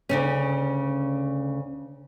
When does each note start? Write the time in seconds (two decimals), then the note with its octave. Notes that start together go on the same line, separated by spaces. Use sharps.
0.09 D2 C#3 C#4